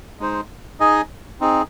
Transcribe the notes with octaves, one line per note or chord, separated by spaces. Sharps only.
G#3 D#4 C5
D#4 G#4 D#5 G#5
C4 D#4 G#4